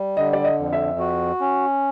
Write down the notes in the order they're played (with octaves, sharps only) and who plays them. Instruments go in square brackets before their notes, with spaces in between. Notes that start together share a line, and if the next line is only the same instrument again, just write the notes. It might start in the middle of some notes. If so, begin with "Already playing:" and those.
Already playing: [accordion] G3
[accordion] D3 [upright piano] D#5
[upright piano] D5
D#5
[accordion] F2
[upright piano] E5
[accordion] F#4
C#4